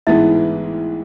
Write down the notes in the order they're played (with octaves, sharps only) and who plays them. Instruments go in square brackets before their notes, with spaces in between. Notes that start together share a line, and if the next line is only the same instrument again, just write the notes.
[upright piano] A1 G#2 E3 G#3 B3 [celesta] E4 E5